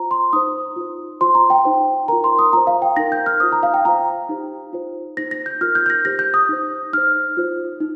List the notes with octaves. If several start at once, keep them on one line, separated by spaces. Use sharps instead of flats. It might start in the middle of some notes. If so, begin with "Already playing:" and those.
Already playing: F4 C5 A#5
C6
D#4 C5 D#6
F4 C5
F4 C5 C6
A#5
G5
D#4 C5
F4 A#4 A#5
C6
D#6
F4 C5 A#5
F5
G5
D#4 A#4 A#6
G6
F6
F4 C5 D#6
A#5
F5
G5
F4 C5 A#5
D#4 G4 C5
F4 C5
D#4 C5 A#6
A#6
G6
F4 A#4 F6
G6
G6
A#6
D#4 G4 C5 A#6
G6
D#6
D#4 C5
D#4 C5 F6
F4 C5
D#4